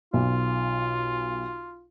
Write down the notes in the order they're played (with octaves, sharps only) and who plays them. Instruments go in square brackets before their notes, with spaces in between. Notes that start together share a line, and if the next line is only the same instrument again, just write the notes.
[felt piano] B1 [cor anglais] F4